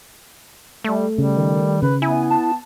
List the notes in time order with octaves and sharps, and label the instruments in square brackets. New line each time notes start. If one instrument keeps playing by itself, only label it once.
[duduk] G3 [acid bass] A3
[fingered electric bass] C#3 [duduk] G3
[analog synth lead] D#3
[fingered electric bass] C#3 [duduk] B4
[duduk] B3 [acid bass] E4 [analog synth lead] G#5
[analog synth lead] A5